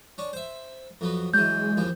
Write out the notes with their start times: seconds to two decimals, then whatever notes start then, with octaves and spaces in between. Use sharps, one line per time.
0.18 C#4 D4
0.33 C5 E5
1.01 F2 F#3 B3
1.34 E3 F#3 G#3 G6
1.77 D#2 E3 F3